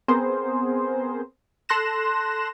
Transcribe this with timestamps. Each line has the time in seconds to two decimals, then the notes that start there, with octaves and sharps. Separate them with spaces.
0.08 B3 C4 G#4 A#4 C5
1.69 A4 C6 F#6 A#6 E7